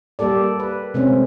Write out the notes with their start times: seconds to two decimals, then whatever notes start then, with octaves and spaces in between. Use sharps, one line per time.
0.19 G3 A#3 G4 A4 D5
0.60 B4
0.94 C3 G#3 A3 C4 C#4